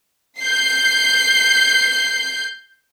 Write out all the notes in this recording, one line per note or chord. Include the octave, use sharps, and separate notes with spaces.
G6 C7